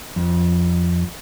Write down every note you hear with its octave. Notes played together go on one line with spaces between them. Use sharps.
F2